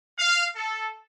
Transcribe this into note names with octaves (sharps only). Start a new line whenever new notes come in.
F5
A4